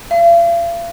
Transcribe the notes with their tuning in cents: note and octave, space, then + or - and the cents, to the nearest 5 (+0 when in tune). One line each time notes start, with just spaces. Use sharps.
F5 -40